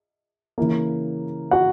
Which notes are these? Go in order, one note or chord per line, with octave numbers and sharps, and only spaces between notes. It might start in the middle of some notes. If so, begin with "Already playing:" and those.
C#3 E3 A#3
F#4 F#5